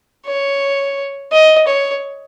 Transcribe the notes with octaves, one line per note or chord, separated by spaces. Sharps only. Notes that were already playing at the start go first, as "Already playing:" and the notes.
C#5
D#5
C#5